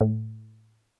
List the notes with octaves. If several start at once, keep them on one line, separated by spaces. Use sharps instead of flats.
A2